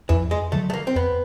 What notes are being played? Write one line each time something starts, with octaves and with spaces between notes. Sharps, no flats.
F2 E3
G#3
D3 F#3 A3
A3
A#3
C4
F2 B3